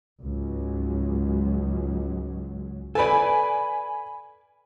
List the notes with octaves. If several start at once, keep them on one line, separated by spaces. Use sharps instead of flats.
C#2 G#2 F#3
A4 B4 D5 G#5 B5